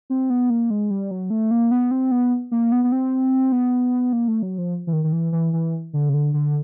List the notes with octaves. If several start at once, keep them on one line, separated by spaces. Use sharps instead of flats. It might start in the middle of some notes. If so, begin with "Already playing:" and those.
C4
B3
A#3
G#3
G3
F#3
A3
A#3
B3
C4
B3
A#3
B3
B3
C4
B3
A#3
A3
F#3
F3
E3
D#3
D#3
E3
E3
E3
D3
C#3
D3
D3